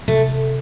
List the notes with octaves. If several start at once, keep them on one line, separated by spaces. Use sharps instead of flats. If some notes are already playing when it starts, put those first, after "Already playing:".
C3 A3